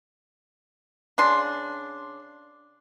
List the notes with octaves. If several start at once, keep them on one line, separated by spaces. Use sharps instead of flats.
C#3 D4 C6